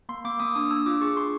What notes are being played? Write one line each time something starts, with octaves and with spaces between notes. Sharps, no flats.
A#3 C6
A#3 D6
A#3 D#6
D4 D#6
D4 E6
F4 D6
G#4 C#6
D4 C6